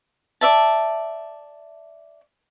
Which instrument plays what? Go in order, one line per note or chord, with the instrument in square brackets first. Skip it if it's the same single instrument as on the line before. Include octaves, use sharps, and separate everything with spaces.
[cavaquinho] D5 E5 A5